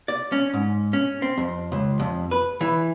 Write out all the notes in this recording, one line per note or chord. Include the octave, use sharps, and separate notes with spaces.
D5
C#4
G#2
C#4
C4
F2
C#2
F2
B4
E3